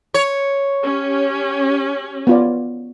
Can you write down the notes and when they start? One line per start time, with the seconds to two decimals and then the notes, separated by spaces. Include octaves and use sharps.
0.14 C#5
0.83 C#4 G4
2.27 B3 F4 D5